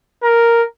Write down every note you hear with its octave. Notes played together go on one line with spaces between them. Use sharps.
A#4